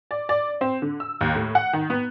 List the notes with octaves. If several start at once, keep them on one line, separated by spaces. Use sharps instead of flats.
D5
D5
C4
D3
E6
D#2
A2
F#5
D#3
B3